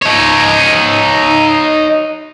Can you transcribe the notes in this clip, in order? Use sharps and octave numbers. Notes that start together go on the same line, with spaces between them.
D#4 C#5